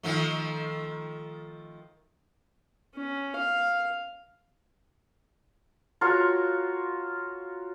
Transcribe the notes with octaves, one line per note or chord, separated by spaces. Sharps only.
D#3 F3 A3
C#4
F5
F4 F#4 A#4 C#5